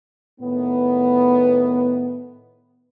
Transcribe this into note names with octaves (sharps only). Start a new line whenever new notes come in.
A2 D#3 B3